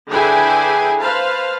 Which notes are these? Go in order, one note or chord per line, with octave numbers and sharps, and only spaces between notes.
D3 E4 G#4 B4 G5 G#5
B4 C5 F5 A5